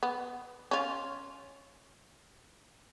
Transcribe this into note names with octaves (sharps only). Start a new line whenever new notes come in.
B3
C#4 F4